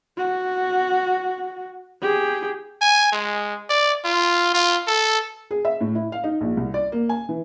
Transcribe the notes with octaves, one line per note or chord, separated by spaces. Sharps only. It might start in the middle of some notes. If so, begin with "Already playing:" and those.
F#4
G4 G#4
G#5
G#3
D5
F4
F4
A4
G#4
E5
A2
E4
F5
D#4
A#1
C2
D5
A#3
G#5
E3